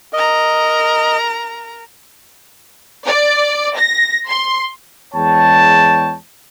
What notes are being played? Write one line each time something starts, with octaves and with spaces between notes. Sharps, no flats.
A#4 D#5 A#5
D5
A#6
C6
E2 G#3 C#5 G5 A5